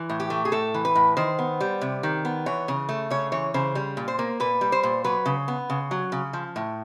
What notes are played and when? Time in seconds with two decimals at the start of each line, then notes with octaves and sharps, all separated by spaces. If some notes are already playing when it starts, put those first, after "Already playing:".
Already playing: E3
0.10 A2
0.20 G4
0.30 A3
0.45 G#4
0.52 A2 A4
0.74 E3
0.85 B4
0.95 A2
1.17 D#3 C5
1.39 B3
1.60 G3
1.81 C3
2.03 D#3
2.25 B3
2.46 E3 C#5
2.68 C#3
2.89 A3
3.10 C#3 C#5
3.32 E3 C#5
3.54 C#3 C5
3.75 G3
3.97 A#2
4.08 C5
4.19 A#3
4.40 A#2 B4
4.61 G3
4.72 C5
4.83 A#2
5.04 F#3 B4
5.26 C#3
5.48 B3
5.70 C#3
5.91 F#3
6.12 C#3
6.33 F3
6.56 A2